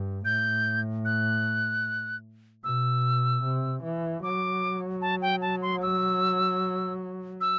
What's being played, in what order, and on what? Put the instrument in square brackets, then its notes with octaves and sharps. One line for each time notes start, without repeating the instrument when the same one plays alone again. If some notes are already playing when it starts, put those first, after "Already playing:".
Already playing: [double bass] G2
[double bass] A2 [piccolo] G6
[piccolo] F#6
[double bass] B2 [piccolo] E6
[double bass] C3
E3
[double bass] F#3 [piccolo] D6
[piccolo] A5
G5
A5
C6
E6
E6